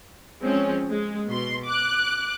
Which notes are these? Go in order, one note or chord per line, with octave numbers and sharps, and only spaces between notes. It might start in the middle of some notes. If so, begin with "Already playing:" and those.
F3 G#3 C4 C#4
G#3
B2 C6
D6 F#6